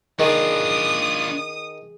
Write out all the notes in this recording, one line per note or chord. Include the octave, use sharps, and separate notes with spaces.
D#3 D4 F4 G#4 D#6